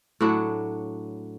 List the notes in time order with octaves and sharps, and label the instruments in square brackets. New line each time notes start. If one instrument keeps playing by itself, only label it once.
[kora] A2 F#3 D4 F#4